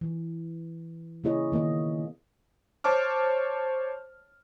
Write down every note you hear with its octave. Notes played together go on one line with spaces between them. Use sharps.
E3
C#3 A#3 E4 G#4 C#5 D#5
D#3 A#3 B3 D#5
C5 C#5 A5 D6 F6